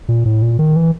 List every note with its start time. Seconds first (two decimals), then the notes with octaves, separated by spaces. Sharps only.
0.09 A#2
0.26 A2
0.42 A#2
0.59 D#3
0.76 E3